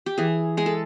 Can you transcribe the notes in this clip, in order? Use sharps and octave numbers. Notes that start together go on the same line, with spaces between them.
G4
E3 G#4
G#3 G#4
A4